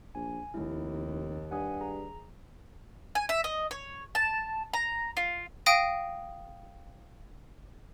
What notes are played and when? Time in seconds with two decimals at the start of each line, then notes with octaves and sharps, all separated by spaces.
0.15 A#1 G#5
0.54 F1 D#2 E4
1.51 G2 F#5 G#5 D#6
1.80 G#4 A#5
3.15 G#5
3.29 E5
3.44 D#5
3.71 C#5
4.15 A5
4.73 A#5
5.17 F4
5.66 F5 G5 D#6 A#6 D7 D#7